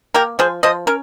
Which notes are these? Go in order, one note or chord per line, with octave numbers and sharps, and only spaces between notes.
A#3 G4 A#4
F3 G#4 C5
F3 C5 D#5
C#4 A#4